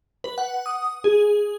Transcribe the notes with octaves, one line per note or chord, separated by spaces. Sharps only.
B4
F#5
D#6
G#4